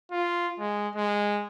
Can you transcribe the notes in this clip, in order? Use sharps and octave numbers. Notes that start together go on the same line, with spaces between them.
F4
G#3
G#3